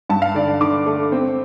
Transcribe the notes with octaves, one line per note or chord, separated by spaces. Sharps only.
G2 A5
F5
D3 D5
D5
D3 D6
A3
C4